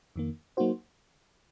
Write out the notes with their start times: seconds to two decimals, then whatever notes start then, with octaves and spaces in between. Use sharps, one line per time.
0.16 F2 D#3 A#3
0.57 F#3 A#3 D#4 F#4 C5